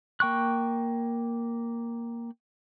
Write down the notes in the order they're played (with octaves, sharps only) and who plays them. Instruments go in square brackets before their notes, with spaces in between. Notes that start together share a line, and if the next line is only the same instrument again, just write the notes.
[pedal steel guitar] A#3 G5 C#6 F#6